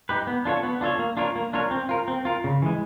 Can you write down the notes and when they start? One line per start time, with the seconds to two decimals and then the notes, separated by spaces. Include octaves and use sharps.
0.09 D#4 G4 B4
0.27 B3
0.45 D4 F4 A4 C#5
0.63 B3
0.81 D4 F4 A4 C#5
0.99 A#3
1.17 D4 F4 A#4 C#5
1.36 A#3
1.53 D4 F4 A#4 C#5
1.71 C4
1.89 F4 A#4
2.08 C4
2.25 F4 A#4
2.44 C#3
2.62 E3 G#3